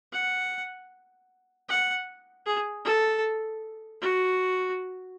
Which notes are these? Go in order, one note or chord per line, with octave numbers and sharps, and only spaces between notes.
F#5
F#5
G#4
A4
F#4